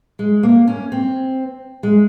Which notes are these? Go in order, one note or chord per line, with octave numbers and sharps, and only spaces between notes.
G#3
A#3
C#4
C4
G#3